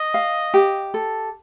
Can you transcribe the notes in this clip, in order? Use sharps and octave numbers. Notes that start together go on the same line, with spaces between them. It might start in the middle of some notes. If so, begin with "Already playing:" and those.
Already playing: D#5
F5
G4
A4